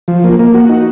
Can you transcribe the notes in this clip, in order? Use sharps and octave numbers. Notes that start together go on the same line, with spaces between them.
F3
A#3
A#3
F#4
D#4